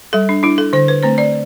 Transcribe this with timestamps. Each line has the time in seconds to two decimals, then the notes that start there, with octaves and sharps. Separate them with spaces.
0.13 G3 A4
0.29 D4
0.43 D4 E4
0.58 A4
0.73 D3 C5
0.88 B4
1.03 A3 C4 C5
1.18 D5